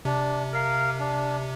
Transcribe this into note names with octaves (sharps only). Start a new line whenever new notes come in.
C3 D4
A#4 F5
D4